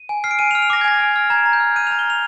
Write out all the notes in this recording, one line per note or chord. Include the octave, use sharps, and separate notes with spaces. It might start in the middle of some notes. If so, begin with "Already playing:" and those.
Already playing: D#7
G#5
F6 C7
D7
G#5 D#7
F7
F6
F7
D6 A#6
G#6
G#5 A#6
G#5
F6
A#5 G#6
A#5
G6
F6
F6 D#7
A#5 F7
G7
A#5 F7